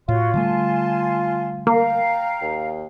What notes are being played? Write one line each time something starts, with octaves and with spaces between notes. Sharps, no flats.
A2 F4 F#4 C#5 C6
D3 G3 A3 G#5 A5 C6
A#3 F5 G5 A#5
D#2